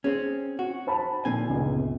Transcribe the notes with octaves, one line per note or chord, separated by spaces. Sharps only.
C4 C#4 G#4
F#4
C5 A5 B5
A#2 D3 C4 G#5
G1 C#2